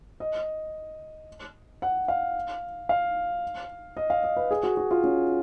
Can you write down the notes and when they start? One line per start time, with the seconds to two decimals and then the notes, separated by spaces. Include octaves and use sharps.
0.20 D#5
1.82 F#5
2.08 F5
2.89 F5
3.97 D#5
4.10 F5
4.24 D#5
4.37 B4
4.51 G#4
4.63 F#4
4.77 F#4
4.91 F4
5.04 C#4